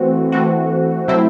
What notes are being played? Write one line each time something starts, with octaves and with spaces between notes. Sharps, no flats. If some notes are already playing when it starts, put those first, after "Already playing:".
Already playing: E3 A3 C4 F#4
E3 A3 C4 F#4
C3 F#3 A3 C4 E4